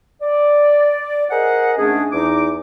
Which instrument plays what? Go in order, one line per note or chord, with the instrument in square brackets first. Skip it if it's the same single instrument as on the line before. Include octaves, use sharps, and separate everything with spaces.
[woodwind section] D5
G#4 A#4 C5 D#5 F#5
G#2 G#3 A3 C#4 D4 G#4
E2 D#4 D6